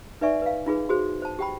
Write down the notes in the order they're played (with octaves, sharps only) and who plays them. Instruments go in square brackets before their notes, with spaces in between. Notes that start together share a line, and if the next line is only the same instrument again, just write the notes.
[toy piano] D#4 B4 D5 E5 G#5 C#6
B4 F5
D#4 F4 G#4 B4
F#4 G#4 C5
C5 A5
G4 G5 B5